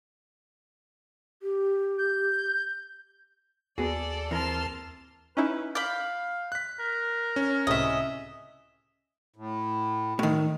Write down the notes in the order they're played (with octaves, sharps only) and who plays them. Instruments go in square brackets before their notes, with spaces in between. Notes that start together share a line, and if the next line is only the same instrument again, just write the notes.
[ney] G4
[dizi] G6
[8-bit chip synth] D#2 [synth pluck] B3 F#4 [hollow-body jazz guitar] G#4 [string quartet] A4 D5
[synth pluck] E3 [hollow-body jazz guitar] C4 A#4 [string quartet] A5 C6 F6
[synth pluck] C#4 D#4 E4 [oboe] B4
[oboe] F5 [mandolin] B5 G6 [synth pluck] D6
[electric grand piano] F#6 B6
[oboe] A#4
[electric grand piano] C#4
[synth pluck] C#2 A2 C3 [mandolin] D#5 E5
[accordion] A2
[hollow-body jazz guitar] A2 D#3